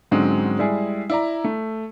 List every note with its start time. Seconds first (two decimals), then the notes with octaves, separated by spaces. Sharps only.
0.11 G#2 D3 F#3 G#3 C4 C#4
0.59 G3 G#3 E4 G#4
1.10 E4 D5 A#5
1.44 A3